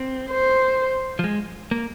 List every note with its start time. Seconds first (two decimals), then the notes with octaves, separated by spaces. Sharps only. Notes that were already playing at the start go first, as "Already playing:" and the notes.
Already playing: C4
0.30 C5
1.19 F3
1.24 G#3
1.71 A#3